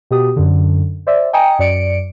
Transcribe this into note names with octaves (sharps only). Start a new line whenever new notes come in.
B2 G4 D#6
F#2 D3
C5 D5 E5
D#5 G5 G#5 A#5 D#6 C#7
F#2 D5 C#7 D7